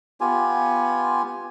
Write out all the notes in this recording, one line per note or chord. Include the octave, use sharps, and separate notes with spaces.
B3 F4 G4 G#5